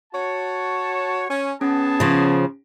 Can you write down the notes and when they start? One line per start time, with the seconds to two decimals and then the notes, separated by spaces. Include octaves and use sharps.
0.13 F#4 C#5 A5
1.29 C#4 G#5
1.61 B3 C#4 G#4 A5
2.00 C#3 F3